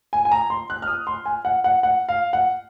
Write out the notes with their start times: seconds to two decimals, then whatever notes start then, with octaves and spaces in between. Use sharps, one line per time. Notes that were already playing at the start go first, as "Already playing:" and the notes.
0.13 G#5
0.25 G#5
0.31 A#5
0.50 C6
0.70 F#6
0.82 F6
0.88 D#6
1.07 C6
1.26 G#5
1.45 F#5
1.64 F#5
1.83 F#5
2.09 F5
2.33 F#5